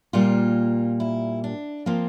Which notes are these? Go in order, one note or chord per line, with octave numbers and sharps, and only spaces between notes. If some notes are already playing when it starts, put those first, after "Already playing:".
A#2 G3 A#3 F4
E4
D4
F3 A#3 C4